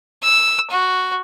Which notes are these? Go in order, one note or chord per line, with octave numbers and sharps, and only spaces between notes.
E6
F#4